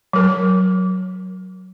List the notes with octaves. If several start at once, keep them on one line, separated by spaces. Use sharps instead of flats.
F#3 A#4